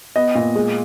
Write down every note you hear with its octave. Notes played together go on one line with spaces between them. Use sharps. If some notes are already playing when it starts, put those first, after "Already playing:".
B3 D#5
A#2
G#3